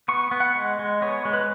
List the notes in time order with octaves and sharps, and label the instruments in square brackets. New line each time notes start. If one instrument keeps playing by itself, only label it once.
[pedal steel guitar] B3 C#6
B3
F#5
G#3
G#3
B3 C#5
G#3
B4